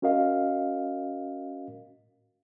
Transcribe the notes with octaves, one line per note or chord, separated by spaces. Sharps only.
C#4 F#4 A#4 D#5 F5